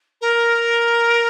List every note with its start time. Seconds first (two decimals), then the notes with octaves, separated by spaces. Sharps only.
0.21 A#4